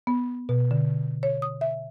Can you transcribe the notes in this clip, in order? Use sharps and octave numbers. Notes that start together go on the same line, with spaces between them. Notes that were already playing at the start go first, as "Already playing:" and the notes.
B3
B2
D3
C#5
D#6
E5